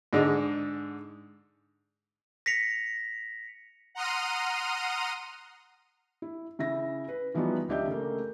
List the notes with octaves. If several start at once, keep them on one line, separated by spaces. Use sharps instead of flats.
G#2 D3 G#3
A#6 B6 C#7 F7
F#5 A#5 C6 D#6 F6 D#7
E4
C#3 E4 E5 A#6
B4
E3 F3 G3 B3 D#4 F#4
C#2 D4 G4 D#5 E5 G6
C#3 A3 A#3